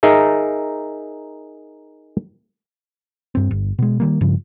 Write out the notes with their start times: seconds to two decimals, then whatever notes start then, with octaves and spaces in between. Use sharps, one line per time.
0.03 D#4 G#4 A#4 E5
3.35 G2 C4
3.51 G1
3.79 B2 G#3
4.00 D#3 G3 A#3
4.21 G2 C#3 F3